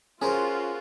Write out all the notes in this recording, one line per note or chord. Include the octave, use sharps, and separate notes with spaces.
C#4 F4 F#4 G#4 A#4 C5